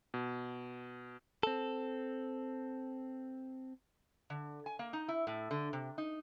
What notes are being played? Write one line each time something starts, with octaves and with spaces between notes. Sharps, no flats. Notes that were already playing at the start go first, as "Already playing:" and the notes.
B2
C4 A4
D3
G#5
A#3
D#4
E4
A2
D3
C3
D#4